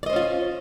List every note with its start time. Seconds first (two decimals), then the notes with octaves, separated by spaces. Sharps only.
0.03 D5
0.06 D#5
0.10 C5
0.13 C#4
0.16 F4